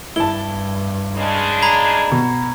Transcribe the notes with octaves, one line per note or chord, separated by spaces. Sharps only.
G2 E4 A5 G7
C#3 G#3 D4
A#5 B5 G#6
B2